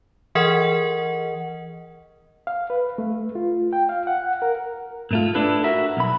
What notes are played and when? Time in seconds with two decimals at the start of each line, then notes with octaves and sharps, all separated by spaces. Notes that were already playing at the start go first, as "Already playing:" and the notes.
0.35 E3 G#4 A#4 D#5 F#5
2.47 F5
2.70 B4
2.98 A3
3.35 F4
3.73 G5
3.89 F5
4.07 F#5
4.42 A#4
5.11 G#2 A3 F4
5.35 D4 E4 A4 B4
5.64 F#4 A#4 E5
5.97 B1 B5